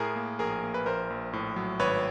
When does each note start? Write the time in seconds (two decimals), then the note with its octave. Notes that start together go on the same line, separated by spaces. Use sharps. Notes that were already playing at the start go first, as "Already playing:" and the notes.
Already playing: A2 G#4 A#4
0.16 A#3
0.39 A#1 G#4 A#4
0.63 A#3
0.74 B4
0.86 A#1 A#4 C5
1.10 A#1
1.33 A2
1.56 F#3
1.79 G#1 B4 C#5